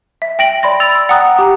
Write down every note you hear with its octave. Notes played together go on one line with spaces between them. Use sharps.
E5
G5 A#6 D7 F#7
D5 B5 C6 A#6
B5 E6 A6 F7
F#5 G5 A#5 D#6 F#6
G4 A#5